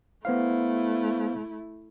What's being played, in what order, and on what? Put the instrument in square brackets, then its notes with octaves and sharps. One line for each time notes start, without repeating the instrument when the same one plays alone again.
[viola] A3 E4 [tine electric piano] B3 C5 F5